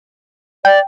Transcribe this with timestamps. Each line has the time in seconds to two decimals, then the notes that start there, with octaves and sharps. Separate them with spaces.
0.65 D5 G5